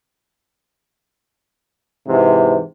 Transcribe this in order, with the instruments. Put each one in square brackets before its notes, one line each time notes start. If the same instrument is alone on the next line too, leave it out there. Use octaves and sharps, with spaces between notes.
[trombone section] G#2 C3 E3